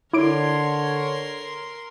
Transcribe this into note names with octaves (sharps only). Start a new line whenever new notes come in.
D3 E4 A#4 C#5 C6 D6 D7